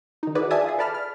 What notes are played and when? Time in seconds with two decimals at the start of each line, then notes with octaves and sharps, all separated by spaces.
0.23 D#3 D#4
0.35 E4 F#4 G#4 B4 D5
0.51 D5 E5 G#5 A5 D#6
0.64 F4 G#4
0.78 A4 B4 D5 A5 B5 F6
0.94 F6